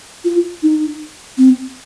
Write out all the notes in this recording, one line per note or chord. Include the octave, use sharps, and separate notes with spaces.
F4
D#4
C4